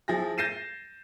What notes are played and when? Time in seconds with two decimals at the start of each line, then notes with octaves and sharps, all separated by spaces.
0.08 F3 E4 G#4 A#6
0.38 G6 A6 A#6 C7 D#7 E7